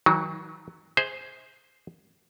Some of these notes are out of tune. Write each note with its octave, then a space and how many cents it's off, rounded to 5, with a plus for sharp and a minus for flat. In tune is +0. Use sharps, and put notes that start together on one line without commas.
D#3 +45 F#3 +0 D#4 +10
G#4 +0 C5 +0 E5 -45